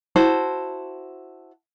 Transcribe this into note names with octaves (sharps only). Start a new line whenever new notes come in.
E4 F#4 C5 A5